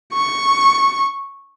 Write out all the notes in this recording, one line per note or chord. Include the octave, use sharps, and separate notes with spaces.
C#6